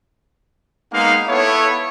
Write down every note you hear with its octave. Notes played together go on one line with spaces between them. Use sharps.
G#3 A#3 B3 D#4 F5
B3 E4 A4 C#5